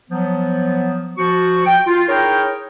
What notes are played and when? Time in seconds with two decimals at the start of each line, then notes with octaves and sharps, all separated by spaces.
0.11 F3 F#3 B3
1.17 F3 F#4 C#6
1.66 G5
1.87 F4
2.09 D#4 E4 G#4 A#4 C#5 G5